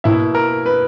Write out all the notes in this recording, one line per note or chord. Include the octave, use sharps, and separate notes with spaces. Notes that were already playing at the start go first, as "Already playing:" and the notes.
B2 A#3 E4 E5
A#4
B4